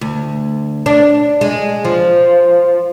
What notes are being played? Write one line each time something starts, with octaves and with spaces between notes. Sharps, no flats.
D2
D4
G#3
F3